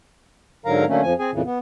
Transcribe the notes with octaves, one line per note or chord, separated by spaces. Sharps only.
G#2 D3 F#3 A#4 F5 A#5
D3 F#3 A3 A#3 C#4
F2 F3 G#5
C4 G#4 G#5
F2 A#2 C#3 E3
B3